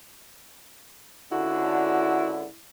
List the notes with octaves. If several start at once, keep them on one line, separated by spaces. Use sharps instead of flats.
C#2 D3 E4 F#4